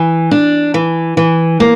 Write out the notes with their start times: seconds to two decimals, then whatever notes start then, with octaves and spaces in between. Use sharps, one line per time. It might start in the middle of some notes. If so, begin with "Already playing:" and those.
Already playing: E3
0.31 D4
0.74 E3
1.17 E3
1.60 A#3